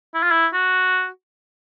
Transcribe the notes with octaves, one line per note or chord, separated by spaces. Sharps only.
E4
F4
E4
F#4